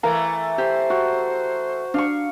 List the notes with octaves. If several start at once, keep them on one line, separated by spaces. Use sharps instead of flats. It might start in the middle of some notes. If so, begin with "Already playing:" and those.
E3 A3 A#4 F5 A#5
G4 C5
F#4
D4 F5 C#6